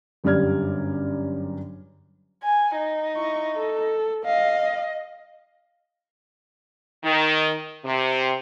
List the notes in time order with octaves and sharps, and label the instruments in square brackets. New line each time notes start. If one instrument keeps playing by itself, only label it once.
[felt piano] G1 F#2 G3 D5 F6 G#6
[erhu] G#5
D#4
[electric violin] E4 C#6
A4
[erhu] D#5 [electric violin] F5
[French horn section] D#3
C3